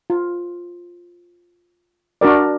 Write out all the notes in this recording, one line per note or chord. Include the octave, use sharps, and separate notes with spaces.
F4
D4 F#4 A#4 D5